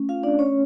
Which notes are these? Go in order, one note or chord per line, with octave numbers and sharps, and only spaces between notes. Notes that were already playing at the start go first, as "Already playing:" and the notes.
Already playing: A3 C#4
F4 F5
D4 D5
C#4 C#5